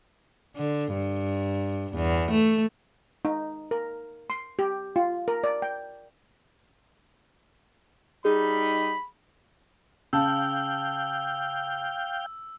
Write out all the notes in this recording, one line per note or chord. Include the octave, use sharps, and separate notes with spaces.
D3
G2
E2
A3
D#4
A#4
C6
G4
F4
A#4
D5
G5
G3 D#4 G#4 B5
C#3 F5 G5 A5 E6 G6